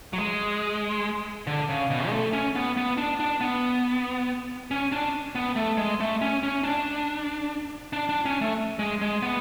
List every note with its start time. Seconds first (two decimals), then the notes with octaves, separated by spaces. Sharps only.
0.13 F#3
0.18 G#3
1.47 D3
1.69 C#3
1.90 B2
2.07 G#3
2.12 A3
2.33 C#4
2.55 B3
2.77 B3
2.97 D4
3.20 D4
3.41 B3
4.71 C#4
4.92 D4
5.35 B3
5.56 A3
5.77 G#3
6.00 A3
6.21 C#4
6.43 C#4
6.63 D4
7.93 D4
8.09 D4
8.25 C#4
8.41 A3
8.79 G#3
9.01 G#3
9.22 B3